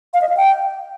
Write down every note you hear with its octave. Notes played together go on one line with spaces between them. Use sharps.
F5
D#5
F5
G5